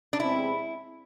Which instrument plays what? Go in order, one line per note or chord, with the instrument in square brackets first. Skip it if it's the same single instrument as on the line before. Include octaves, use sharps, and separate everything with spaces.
[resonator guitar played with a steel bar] D4
[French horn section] E2 C3 G#3 C4 [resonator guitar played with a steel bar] E4